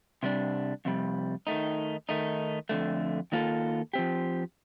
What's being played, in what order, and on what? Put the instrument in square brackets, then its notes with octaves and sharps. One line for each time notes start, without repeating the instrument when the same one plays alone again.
[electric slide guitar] C3 G3 D4
F2 C3 G3
D#3 A3 D#4
D#3 A3 D#4
F2 D3 A3
D#3 A#3 F4 A4
F3 C4 G4